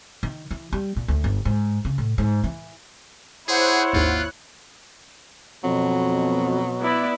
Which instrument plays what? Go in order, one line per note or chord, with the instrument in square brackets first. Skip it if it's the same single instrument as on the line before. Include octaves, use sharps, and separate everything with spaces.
[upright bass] D#3
E3
G3
A#2
D2
G1
G#2
C#3
A2
G#2
E3
[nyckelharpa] E4 C#5 [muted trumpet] G#4 [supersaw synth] C5 F#5
[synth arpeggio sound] G#1 D#2 [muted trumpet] F4 [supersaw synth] F#6
[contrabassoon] F2 [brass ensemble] B2 [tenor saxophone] F#3
[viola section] B3 E4 D5